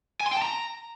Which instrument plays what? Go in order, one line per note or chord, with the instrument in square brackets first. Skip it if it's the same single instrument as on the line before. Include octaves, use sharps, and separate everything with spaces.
[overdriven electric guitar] G#5
C6
G5
A5
A#5